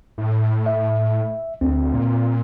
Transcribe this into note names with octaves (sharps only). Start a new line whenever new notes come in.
A2
E5
D2 C4
A#2